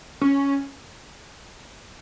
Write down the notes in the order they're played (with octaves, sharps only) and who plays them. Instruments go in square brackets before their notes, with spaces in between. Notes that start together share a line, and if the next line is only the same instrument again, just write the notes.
[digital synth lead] C#4